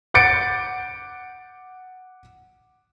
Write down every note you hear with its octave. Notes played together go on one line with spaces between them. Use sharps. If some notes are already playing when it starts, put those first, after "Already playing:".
F#5 D6 G6 A6 C#7 D7